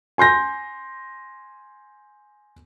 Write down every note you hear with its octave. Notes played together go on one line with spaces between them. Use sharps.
G#5 C6 G6 A#6